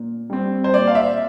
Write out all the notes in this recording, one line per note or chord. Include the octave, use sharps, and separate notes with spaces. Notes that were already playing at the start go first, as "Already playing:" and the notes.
Already playing: A#2
G3 C4
C5
A#2 D5
F5
E5